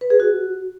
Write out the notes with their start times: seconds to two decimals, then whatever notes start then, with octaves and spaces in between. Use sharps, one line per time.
0.01 B4
0.10 G#4
0.20 F#4